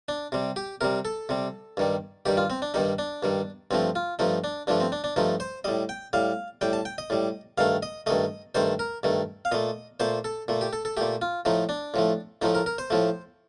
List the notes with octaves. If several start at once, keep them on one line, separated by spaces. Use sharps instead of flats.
D4
C3 G3
G4
C3 G3 A#4
A4
C3 G3
G2 D#3 G3
G2 D#3 G3 G4
F4
C4
D4
G2 D#3 G3 D#4
D4
G2 D#3 G3
G2 F3 A3 C4
F4
G2 F3 A3 D#4
D4
G2 F3 A3 D4
C4
D4
D4
G2 F3 A3 D#4
C5
A2 G3 D#5
G5
A2 G3 F5
A2 G3 G5
A5
G5
D#5
A2 G3
G2 D#3 A3 F5
D#5
G2 D#3 A3 D#5
G2 D#3 A3 C5
A#4
G2 D#3 A3
F5
A#2 A3 D#5
A#2 A3 C5
A4
A#2 A3
G4
A4
A4
A#2 A3 G4
F4
A2 F3 A3 D#4
D4
A2 F3 A3
A2 F3 A3 D#4
A#4
A#4
C5
A2 F3 A3